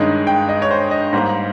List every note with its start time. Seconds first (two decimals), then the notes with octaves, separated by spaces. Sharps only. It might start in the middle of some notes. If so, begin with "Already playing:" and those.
Already playing: G2 D#3 G#3 C#4 D#5
0.27 G5
0.49 D#5
0.62 C#5
0.71 C5
0.91 D#5
1.13 G#2 G3 A#3 C5